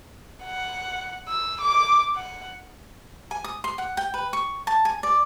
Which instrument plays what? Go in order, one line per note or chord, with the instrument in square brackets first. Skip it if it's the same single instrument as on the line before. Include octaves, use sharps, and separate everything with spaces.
[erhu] F#5
E6
D6
F#5
[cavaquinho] G#5
D#6
C6
F#5
G5
B4
C#6
A5
G#5
D5